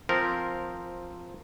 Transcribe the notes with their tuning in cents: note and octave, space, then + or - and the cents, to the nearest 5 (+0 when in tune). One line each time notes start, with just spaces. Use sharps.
F3 +5 C4 +0 A#4 -10